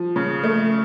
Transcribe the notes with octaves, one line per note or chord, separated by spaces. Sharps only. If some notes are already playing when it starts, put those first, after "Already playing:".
Already playing: F3
C#3
A3